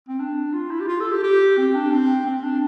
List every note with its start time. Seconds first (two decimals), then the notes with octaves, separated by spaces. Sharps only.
0.09 C4
0.20 D4
0.54 F4
0.71 E4
0.81 G4
0.88 F4
1.00 A4
1.11 G4
1.23 G4
1.57 C4
1.75 D4
1.91 C4
2.26 C4
2.44 D4